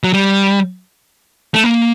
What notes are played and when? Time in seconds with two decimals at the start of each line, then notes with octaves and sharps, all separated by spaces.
0.04 F#3
0.13 G3
1.54 A3
1.64 A#3